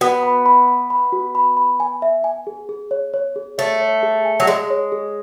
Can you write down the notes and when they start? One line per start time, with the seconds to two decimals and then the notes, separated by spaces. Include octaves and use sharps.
0.01 B3 F#4
0.23 B5
0.46 B5
0.68 B5
0.90 B5
1.12 F#4
1.35 B5
1.57 B5
1.80 G#5
2.02 E5
2.24 G#5
2.47 G#4
2.69 G#4
2.91 C#5
3.14 C#5
3.36 G#4
3.58 A3 C#5
3.81 C#5
4.03 G#4
4.25 G#5
4.40 F#3
4.47 G#3 G#4
4.70 C#5
4.92 G#4